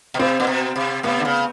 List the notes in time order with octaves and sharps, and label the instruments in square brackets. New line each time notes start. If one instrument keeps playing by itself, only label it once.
[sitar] B2
[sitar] C3 [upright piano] C4
[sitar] A#2
B2
C3
[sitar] C3 [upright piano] B3
[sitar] D3
C#3